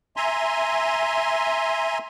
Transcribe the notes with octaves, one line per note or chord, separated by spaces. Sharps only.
E5 G#5 A#5 C6